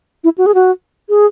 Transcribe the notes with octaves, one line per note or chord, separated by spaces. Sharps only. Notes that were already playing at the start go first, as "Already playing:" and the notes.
E4
F#4
G#4
F#4
G#4